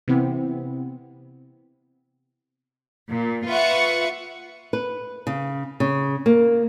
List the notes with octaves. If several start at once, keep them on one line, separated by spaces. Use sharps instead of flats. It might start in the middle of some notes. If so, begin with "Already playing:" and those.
C3 E3 B3 C4 E4
A#2
F4 B4 E5 F#5 C#6
B4
C#3
C#3
A#3